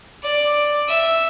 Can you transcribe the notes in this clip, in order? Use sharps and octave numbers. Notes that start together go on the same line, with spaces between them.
D5
E5